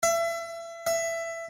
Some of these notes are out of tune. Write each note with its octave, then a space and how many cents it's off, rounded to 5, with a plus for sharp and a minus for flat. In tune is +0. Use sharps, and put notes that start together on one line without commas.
E5 +30
E5 +15